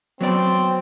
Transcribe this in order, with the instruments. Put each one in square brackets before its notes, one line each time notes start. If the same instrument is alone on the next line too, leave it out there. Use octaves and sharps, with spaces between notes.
[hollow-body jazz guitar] F#3 B3 D5 [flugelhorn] C4